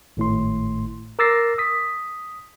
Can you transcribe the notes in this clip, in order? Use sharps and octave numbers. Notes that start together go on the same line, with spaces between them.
G#1 A2 C6
A#4 D6 E6 A6 A#6 C7
D#6 B6